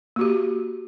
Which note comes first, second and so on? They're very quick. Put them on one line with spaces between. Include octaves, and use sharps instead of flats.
A#3 F#4 G4